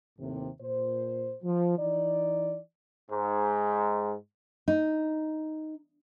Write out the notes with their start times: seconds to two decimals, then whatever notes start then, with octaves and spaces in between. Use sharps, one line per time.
0.19 D#2 A2 C3
0.61 A#2 C5
1.43 F3
1.79 E3 D#4 D5
3.10 G#2
4.68 D#4